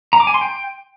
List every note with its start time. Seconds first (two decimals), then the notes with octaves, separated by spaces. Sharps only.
0.13 A#5
0.20 D6
0.27 G#5
0.34 C6
0.41 G5